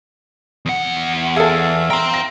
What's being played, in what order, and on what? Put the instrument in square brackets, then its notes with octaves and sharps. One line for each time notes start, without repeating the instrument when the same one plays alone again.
[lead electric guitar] E2 F#5
[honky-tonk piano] G#4 A4 [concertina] E5 F5
[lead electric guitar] G5 C6 [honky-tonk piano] A#5
[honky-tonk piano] A#6